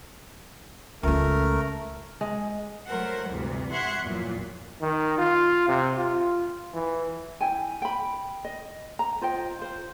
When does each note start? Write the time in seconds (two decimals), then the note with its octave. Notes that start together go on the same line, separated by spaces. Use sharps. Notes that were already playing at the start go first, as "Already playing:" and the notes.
1.03 C#2 G#3 A3 A#4
2.21 G#3
2.87 F#3 A3 A#4 C5 F#5
3.28 D2 G2 C3 E3
3.71 E5 F#5 C6 C#6 F#6 G#6
4.02 E2 G2 A#2 F3 F#3
4.82 D#3
5.18 F4
5.68 C3
5.97 F4
6.74 E3
7.41 E4 G5 G#5
7.82 G5 B5
8.45 D#5
8.99 A#5
9.21 F4 C5 D#5 G5
9.59 F4 C5